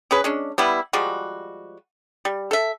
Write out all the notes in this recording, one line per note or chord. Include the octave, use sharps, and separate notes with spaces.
C#4 G#4 B4
G#3 C#4 D4
G3 B3 E4
F3 G3 G#3 F#4
G3
A4 E5